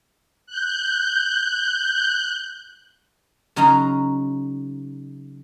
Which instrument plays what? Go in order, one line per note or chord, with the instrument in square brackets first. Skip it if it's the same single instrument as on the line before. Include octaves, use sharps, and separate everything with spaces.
[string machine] F#6 G6
[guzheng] C#3 F#3 D#4 F5 A#5